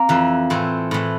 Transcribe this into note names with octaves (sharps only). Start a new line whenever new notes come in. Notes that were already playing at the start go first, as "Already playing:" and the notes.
Already playing: A#3 C4
F2 E3
A2 E3 C4
A2 E3